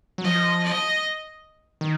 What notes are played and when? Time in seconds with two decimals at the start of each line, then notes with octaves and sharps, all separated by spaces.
0.18 F#3
0.24 F3 D#5
0.64 D#5
1.81 D#3